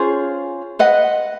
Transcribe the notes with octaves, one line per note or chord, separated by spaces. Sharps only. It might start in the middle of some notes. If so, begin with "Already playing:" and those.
Already playing: C#4 F4 G#4 C5
B4 D#5 F#5